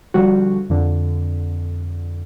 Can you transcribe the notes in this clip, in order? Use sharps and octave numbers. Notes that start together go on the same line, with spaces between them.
D3 F3 G3 F#4
F2 D3